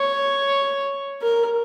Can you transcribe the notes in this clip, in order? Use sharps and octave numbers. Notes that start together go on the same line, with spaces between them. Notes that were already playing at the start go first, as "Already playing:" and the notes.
Already playing: C#5
A#4